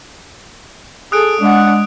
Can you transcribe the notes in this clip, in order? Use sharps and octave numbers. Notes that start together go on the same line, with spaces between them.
G#4 A4 D#6 F#6 D7
G#3 D4 F#5